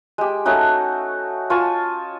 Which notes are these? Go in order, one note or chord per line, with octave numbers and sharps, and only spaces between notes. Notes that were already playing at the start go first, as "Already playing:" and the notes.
G#3 G4
A3 C#4 D#4 F#4
F4 G#5 A5 C#6